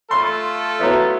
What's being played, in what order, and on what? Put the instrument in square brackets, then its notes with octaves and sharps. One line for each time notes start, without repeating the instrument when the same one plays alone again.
[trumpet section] A3 F4 A4 [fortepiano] C6
[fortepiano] F#3 B3 E4